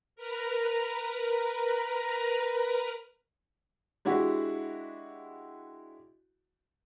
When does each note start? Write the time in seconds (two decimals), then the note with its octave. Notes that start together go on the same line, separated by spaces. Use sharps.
0.16 A#4 B4 A#5
4.05 G#3 D4 E4 F#4 G4